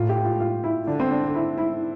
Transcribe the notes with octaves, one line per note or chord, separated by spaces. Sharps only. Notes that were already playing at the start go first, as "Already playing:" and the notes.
Already playing: A2 F4
G4
F4
F4
E4
D3 D4
C4
D4
E4
E4